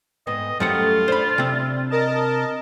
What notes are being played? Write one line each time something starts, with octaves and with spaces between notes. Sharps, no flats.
G#2 B3 C4 D#5
F#2 G3 A3 F4 C5 F#5
D4 C5 B5
C3 C4
A#4 D#5 A5